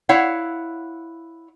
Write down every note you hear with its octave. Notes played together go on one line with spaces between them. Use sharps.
E4 C#5 F5 F#5